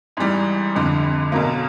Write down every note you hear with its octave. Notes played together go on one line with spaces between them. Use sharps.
G#1 G#2 E3 G3
F1 F2 D3
B1 B2 F#3 A#3